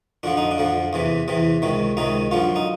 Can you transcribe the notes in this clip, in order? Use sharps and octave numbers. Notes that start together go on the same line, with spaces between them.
F2 D3 F3 D4
D#4
D4
F2 D3 F3
E2 C3 E3
E2 C3 E3
C#2 C3 D#3
C#2 C3 D#3 D#4
F#2 D3 F3 F4
D#4